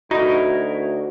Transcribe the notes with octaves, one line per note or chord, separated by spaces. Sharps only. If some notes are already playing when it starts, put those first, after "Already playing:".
D2 D#4 E4 F#4 A#4